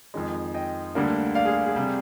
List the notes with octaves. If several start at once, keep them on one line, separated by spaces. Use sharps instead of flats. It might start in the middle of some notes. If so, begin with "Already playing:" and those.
F2 D#3 G#3
D#5 G5
D2 D3 G3 A#3
D5 F5
G#4
G#4
C3 G3